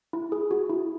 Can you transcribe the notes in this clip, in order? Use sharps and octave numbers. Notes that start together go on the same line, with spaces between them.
E4
G#4
F#4
E4